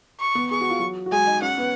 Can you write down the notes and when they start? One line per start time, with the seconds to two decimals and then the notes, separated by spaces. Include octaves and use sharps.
0.20 C#6
0.35 B3
0.51 G#4 C#6
0.61 F#4
0.70 F4
0.79 F#3 F#4
1.06 F#4
1.12 G#3 G#4 G#5
1.27 D#4 D#5
1.42 C#4 C#5 F#5
1.58 B3 B4